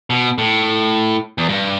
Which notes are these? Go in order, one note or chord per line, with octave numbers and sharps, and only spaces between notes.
B2
A2
E2
G2